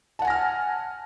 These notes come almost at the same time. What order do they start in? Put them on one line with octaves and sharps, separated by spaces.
A5 F#5 G#5 A#6 F6